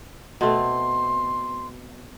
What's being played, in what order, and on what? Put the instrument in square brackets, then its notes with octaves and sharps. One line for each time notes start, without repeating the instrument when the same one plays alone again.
[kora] B2 A3 C4 [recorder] C6